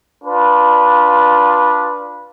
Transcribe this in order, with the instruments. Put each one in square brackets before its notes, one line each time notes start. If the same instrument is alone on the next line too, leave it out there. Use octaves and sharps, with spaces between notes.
[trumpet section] D4 F4 B4